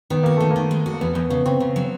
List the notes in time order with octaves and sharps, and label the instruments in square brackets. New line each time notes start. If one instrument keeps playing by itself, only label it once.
[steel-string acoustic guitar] D#3 [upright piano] B3
[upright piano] A#3 [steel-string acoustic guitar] F#4
[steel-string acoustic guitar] D#3 [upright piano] A3
[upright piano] A#3
[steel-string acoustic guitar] D#3
G#3
F#4
[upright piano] A#3
[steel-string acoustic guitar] E2 [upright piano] B3
[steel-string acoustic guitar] E2 [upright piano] B3
[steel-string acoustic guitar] C#3 [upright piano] B3
[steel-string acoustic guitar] C#3 [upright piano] C4
[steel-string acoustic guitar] C#3
F#3